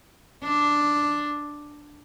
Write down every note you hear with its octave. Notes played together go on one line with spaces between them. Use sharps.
D4